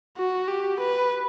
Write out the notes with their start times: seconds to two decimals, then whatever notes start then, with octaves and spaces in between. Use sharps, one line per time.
0.17 F#4
0.48 G4
0.81 B4